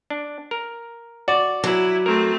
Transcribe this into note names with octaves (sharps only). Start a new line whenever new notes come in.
D4
A#4
F#4 D5
F#3 E4
A3 C4 A#4